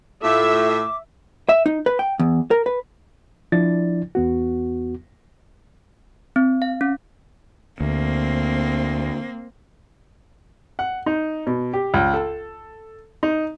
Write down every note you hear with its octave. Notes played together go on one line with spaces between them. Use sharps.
A2 A3 F4 A4 E5 D6
E5
D#4
B4
G5
E2
A#4
B4
F3 D4 E4 D5 A6
E2 B3 F#4
C4
F5
C#4
D2 A#3 C4
F#5
D#4
B2
G4
C#2
A4
D#4